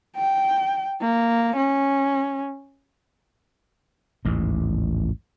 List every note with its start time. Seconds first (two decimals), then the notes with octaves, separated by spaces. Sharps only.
0.17 G5
1.01 A#3
1.57 C#4
4.25 A1 D#2 G#2